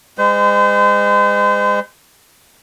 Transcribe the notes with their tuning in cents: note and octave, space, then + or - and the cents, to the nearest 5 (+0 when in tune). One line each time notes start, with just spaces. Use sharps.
G#3 -30 C5 -35